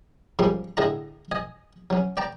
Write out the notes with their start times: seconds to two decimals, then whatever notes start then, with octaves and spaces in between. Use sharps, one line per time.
0.39 G#2 F3 G3 A#3 C#4
0.77 A2 D3 G#4 D#5 A5 A#5
1.32 D#5 G#5
1.90 F#3 C#4
2.17 D5 G5 A5 A#5